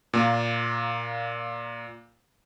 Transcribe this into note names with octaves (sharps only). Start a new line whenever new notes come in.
A#2 A#3